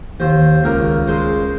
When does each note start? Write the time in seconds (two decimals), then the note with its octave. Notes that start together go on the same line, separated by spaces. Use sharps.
0.20 D#2 C5
0.64 C#2 A#4
1.07 G#3 C5